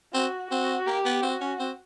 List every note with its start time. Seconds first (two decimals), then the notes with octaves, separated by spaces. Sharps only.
0.14 C4 F#4
0.51 C4 F#4
0.86 A#3 G4
1.05 B3
1.22 C4 F#4
1.41 C#4
1.59 C4